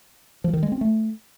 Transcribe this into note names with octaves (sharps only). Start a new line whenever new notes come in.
F3
D#3
G#3
C4
A3